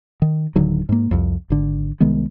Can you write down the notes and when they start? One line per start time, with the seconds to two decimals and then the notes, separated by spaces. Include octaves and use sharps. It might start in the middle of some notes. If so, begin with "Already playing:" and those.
0.22 D#3
0.56 D1 D3 D#3 F#3
0.89 G#2 A#3
1.11 C2 F2
1.50 G#1 D3
2.00 C2 D#3 G#3 B3